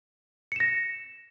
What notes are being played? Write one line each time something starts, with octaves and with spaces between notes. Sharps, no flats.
A#6 C#7 E7